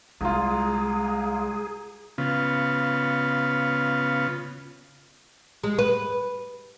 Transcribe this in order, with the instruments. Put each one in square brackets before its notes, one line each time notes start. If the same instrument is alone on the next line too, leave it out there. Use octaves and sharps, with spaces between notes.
[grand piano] C2 F4 [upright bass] G#3 [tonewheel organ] G#4 [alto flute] A#5
[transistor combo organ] C#3 B3 F4
[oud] G#3
B4